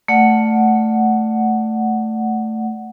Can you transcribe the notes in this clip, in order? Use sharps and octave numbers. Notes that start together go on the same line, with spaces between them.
A3 D5 F#5